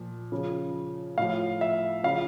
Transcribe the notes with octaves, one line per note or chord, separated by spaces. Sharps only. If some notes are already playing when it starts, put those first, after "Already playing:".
Already playing: A#2 F3
C#3 F3
A2 F3 F5
E5
C#3 F3 F5